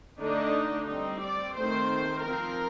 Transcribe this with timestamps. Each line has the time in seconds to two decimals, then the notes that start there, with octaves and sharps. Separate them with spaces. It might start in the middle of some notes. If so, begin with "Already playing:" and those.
0.20 D3 A3 D4 D#4
0.88 G3 C4 D#4
1.22 D5
1.56 D#3 A3 C4 C5
2.23 F3 C4 A#4